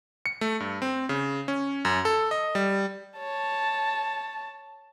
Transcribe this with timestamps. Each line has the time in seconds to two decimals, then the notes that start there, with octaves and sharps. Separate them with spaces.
0.26 C#7
0.41 A3
0.60 G2
0.82 C4
1.09 C#3
1.48 C#4
1.85 F#2
2.05 A4
2.31 D#5
2.55 G3
3.19 C#5 A5